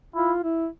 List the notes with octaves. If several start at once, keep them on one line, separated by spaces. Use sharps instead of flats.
E4 F4
E4